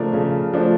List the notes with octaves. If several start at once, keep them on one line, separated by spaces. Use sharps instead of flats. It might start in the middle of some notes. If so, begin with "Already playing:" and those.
Already playing: C#3 F3 A3 D4 A#4
C#3
F3 A3 D4